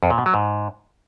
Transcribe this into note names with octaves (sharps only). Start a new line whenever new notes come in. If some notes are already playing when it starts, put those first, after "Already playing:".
F2
A#2
B2
F#3
G#2